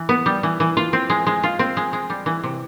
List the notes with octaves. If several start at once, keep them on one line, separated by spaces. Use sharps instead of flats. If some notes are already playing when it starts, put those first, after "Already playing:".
Already playing: E3
B3
G3
E3
E3
F4
C4
G#3
G#3
F4
C4
G#3
G#3
G3
E3
C3